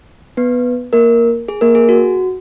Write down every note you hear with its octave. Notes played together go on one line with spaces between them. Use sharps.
B3 B4
A#3 A#4
G#4
A#3 A#4
G#4
F#4